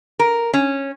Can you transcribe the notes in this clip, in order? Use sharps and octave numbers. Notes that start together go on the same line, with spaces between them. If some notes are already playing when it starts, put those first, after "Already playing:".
A#4
C#4